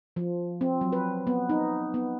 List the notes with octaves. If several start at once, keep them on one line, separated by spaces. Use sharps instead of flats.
F3
C4
F#3
B4
B3
D#4
B3